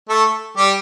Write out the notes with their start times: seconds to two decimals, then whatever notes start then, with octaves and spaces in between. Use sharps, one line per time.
0.09 A3 A4
0.57 G3 G4